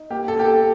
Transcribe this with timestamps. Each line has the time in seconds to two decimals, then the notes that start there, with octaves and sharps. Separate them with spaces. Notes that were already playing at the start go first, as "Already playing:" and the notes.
Already playing: D#4
0.10 A#3 G4
0.28 A4
0.36 A#3 G4
0.45 A4